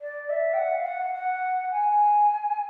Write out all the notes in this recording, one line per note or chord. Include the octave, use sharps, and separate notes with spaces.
D5
E5
G5
F#5
F5
F#5
F#5
G#5